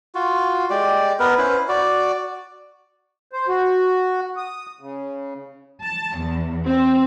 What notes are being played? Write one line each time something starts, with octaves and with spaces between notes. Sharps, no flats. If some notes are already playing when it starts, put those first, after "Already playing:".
F4 F#4
G#3 G4 D5
B3 A#4 B4
C#4 E4 B4 C5
F#4 D5
C5
F#4
D#6
C#3
A5
E2
C4